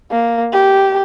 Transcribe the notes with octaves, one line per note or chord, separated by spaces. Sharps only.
A#3
G4